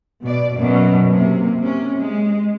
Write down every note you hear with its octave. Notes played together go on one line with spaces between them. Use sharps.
B2 D5
F#2 B2 F#3
C3 A#3
C3 C#4
G#3